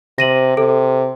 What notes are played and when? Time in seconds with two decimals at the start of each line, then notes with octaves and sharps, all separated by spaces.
0.18 C3 A#6 D#7 F#7
0.57 C3 A4